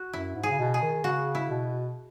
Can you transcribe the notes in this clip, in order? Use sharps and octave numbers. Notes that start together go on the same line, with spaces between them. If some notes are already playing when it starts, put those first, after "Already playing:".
Already playing: F#4
F#2 E4
G#2
G#4
C#3
B2
G#4
D#3
C#3 F#4
E4
B2